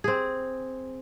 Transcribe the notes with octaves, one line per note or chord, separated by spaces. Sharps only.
C4 G#4